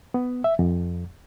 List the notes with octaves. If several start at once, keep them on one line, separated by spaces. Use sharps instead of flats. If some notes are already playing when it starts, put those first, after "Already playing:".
B3
E5
F2